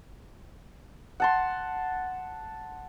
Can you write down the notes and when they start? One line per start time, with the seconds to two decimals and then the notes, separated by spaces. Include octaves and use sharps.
1.20 F#5 A5 C6